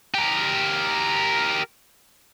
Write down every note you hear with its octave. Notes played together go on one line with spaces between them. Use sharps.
G4 A#4